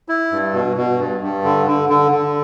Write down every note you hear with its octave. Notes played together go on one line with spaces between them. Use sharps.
E4
G2
B2
B2
G2
G2
D3
D3
D3
D3